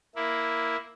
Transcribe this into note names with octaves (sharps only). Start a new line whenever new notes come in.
A#3 E4